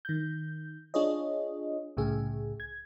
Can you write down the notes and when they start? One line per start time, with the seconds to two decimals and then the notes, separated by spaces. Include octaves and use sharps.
0.05 D#3 G6
0.94 D4 F4 G#4 C#5 D#5
1.97 C2 A2 C#3 G#4
2.60 G#6